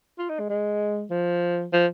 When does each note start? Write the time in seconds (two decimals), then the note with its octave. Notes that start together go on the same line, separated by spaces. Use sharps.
0.18 F4
0.29 D#4
0.39 G#3
0.49 G#3
1.10 F3
1.73 F3